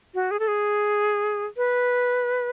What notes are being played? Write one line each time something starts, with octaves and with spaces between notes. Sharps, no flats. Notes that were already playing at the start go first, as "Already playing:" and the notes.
F#4
G#4
A4
G#4
B4